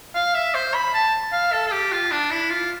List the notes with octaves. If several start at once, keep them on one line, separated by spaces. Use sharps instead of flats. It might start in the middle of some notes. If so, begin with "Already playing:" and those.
F5
E5
C5
B5
A5
F5
A4
A4
G4
F4
D4
E4
F4